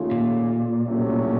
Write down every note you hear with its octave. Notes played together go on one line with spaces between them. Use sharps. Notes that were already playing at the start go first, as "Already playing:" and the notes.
Already playing: D#2 C#3 A3 C#4 F4
A#2
C2 C3 F#3 A3 C#4